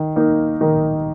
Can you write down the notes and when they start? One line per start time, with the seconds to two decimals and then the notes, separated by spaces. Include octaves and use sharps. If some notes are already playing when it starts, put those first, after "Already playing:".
Already playing: D#3
0.16 A#3 D#4
0.61 D#3